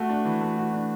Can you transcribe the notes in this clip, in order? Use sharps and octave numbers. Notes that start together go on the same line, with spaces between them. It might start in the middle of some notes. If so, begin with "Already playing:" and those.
Already playing: A3 F#4
D4
E3
A3
F#4
D4